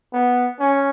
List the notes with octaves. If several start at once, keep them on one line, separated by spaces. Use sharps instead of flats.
B3
C#4